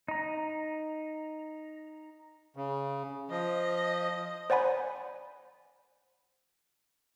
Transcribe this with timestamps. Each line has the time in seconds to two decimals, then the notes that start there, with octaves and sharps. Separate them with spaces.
0.08 D#4 A#5
2.56 C#3
3.30 F3 D#5
4.50 C5 D5 F#5 G#5 B5